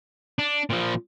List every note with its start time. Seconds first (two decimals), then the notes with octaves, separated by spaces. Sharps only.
0.39 D4
0.70 A#2 F3